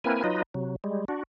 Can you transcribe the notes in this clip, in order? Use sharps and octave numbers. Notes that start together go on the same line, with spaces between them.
A#3 C4 E4 A#4 B4 G#5
F#3 D#4 F4 B4 D#5
C3 F#3
G3 G#3
D4 F#4